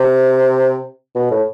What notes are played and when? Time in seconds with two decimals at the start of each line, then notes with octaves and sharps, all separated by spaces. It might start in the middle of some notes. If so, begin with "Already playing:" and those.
Already playing: C3
1.15 B2
1.31 A2